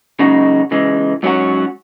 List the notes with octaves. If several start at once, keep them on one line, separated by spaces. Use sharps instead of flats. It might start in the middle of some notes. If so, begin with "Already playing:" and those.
F#2 C#3 G#3 D#4 F#4
C#3 E3 G#3
G#2 F#3 C#4 F#4